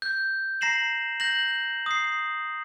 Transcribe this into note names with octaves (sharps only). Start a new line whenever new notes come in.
G6
A#5 A#6 C7 E7 F#7
G6 A#6 F#7
D#6 C7